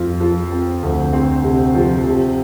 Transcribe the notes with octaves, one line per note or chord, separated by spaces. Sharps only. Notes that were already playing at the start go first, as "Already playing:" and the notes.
Already playing: F2 F4
F3
C4
D2
C4
C3
F3
C3